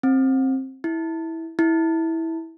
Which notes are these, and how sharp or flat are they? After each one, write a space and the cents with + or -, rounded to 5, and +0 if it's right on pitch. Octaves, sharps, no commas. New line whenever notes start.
C4 +20
E4 -15
E4 -15